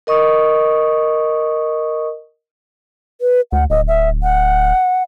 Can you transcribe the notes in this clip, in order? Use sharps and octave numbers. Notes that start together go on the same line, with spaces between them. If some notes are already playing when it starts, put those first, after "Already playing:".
A#4 D#5 C#6 D#6
B4
D2 F#5
D1 D#5
E5
F#5